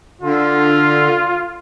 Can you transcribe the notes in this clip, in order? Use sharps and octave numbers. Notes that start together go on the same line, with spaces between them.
D3 F4